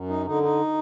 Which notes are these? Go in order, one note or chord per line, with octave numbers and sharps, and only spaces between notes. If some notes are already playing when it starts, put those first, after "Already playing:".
Already playing: F#2
D#4
D3 D#4
D#4